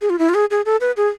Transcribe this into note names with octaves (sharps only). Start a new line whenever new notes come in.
G#4
F4
E4
F4
G#4
G#4
A4
B4
G#4